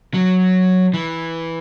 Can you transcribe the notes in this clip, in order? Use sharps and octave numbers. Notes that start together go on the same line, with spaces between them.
F#3
E3